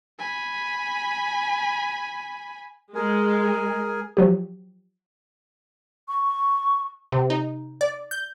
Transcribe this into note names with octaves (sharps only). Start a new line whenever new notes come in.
G#5 B5
G#3 G#4 A#4 G#5
F3 F#3 G4
C#6
C3
D#4
D5
G6